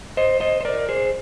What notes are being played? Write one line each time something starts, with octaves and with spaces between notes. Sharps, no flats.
C5 D#5
C5 D#5
C5
A#4 D5
G#4 C5